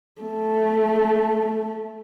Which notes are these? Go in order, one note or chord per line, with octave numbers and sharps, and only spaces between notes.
A3